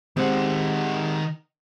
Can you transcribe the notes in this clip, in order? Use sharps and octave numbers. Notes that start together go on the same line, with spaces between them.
D#3 G#3 C4 G4 F#5